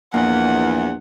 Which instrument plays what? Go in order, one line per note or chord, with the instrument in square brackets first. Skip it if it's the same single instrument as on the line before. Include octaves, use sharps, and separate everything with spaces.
[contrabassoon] A#1 [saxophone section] E2 [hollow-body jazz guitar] A#3 [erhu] F#5